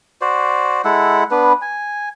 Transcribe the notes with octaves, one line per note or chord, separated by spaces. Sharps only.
F#4 C5 D5
G#3 E4 A4 F#5
B3 D4 B4
G#5